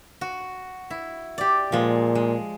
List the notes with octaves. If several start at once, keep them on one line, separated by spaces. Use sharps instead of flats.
F#4
E4
G4 D5
A#2 F3 G#3
G#3